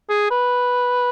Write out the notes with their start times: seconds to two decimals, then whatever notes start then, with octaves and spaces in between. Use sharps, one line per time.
0.09 G#4
0.31 B4